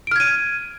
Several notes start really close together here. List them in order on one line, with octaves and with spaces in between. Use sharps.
D7 F6 G#6 D#7